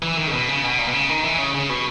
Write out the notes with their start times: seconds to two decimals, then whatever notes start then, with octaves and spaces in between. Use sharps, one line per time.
0.03 E3
0.17 D#3
0.27 C#3
0.33 B2
0.49 C#3
0.64 B2
0.79 A#2
0.88 B2
0.93 C#3
1.09 D#3
1.24 E3
1.38 C#3
1.54 C#3
1.70 B2